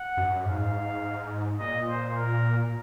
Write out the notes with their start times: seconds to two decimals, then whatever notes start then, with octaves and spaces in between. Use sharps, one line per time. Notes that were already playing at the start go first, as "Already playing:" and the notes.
Already playing: F#5
0.17 F#2
0.45 G#2 F5
1.60 A#2 D#5
1.88 C5
2.17 A#4